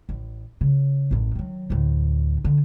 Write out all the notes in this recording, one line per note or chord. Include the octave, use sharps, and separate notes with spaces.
A1
C#3
A1 F#2
D#3 F#3
D2 A2
D3